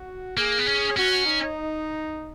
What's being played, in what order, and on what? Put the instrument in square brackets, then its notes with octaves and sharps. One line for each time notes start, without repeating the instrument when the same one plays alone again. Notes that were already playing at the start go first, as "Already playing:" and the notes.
Already playing: [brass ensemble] F#4
[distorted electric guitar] A#3 [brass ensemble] G#4
[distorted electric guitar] B3
C#4
[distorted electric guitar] C#4 [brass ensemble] F#4
[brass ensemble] D#4